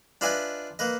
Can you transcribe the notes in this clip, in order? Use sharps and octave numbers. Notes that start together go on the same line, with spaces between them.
D4 F4 B4 D#5 E5 G#5
A#3 B4 D#5